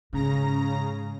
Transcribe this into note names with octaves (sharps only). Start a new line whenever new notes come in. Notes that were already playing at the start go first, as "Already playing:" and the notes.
G#2 C#3 A#5 A#6